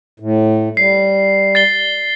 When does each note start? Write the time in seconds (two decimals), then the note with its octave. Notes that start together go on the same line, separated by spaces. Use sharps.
0.20 A2
0.77 G3 C7
1.55 A6 C7 G7